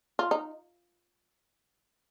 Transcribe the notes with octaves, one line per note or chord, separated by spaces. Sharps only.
F4
D#4